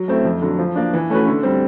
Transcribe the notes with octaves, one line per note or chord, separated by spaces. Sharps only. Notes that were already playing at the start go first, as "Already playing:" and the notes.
Already playing: F#3
A3 C4 E4
F2
D3 F#3
F3
A#3 D4
E3
A3 C#4 F#4 B4
D3
G3 C4